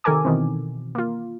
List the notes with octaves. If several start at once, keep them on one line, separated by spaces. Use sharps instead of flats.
C3 D#3 A4 A#4 G#5 D6
B2 D#3 E3 C4
A#3 F4